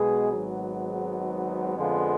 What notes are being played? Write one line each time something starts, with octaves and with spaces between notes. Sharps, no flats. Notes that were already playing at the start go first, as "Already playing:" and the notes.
Already playing: B1 B2 G#3 B3 G#4
G#1 G#2 F#3 B3
F2 D3 F3 G#3 B3 F4